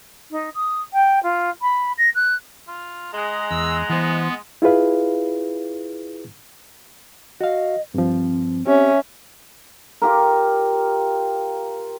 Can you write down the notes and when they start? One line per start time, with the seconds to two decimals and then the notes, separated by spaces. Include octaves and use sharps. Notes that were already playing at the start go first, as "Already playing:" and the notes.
0.31 D#4
0.54 D#6
0.93 G5
1.23 F4
1.62 B5
1.98 A#6
2.15 F#6
2.68 F4
3.13 G#3 G#4 F#5 A#5
3.51 E2 E6
3.89 E3 B3 C5
4.62 E4 F4 G#4 B4 F5
7.41 F#4 D#5 F5
7.94 G2 F3 C4
8.67 C4 C#4 G4 E5
10.02 F4 G4 A#4